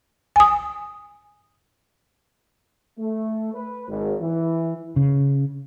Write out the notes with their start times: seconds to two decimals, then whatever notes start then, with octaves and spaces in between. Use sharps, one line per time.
0.36 G#5 D#6
2.98 A3
3.53 B4
3.88 G#1
4.20 E3
4.96 C#3